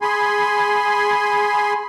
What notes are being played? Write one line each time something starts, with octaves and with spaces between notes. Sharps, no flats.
G#4 G#5 B5 C6